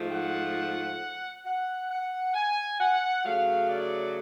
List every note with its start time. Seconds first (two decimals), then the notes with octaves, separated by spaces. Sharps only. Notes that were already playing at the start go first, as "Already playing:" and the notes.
Already playing: G#2 F3 A3
0.13 F#5
1.45 F#5
1.91 F#5
2.35 G#5
2.80 F#5
3.25 C#3 F#3 A3 F5
3.69 D5